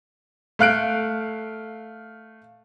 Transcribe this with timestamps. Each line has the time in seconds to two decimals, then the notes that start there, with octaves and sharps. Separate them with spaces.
0.59 A3 F5 F#6 D7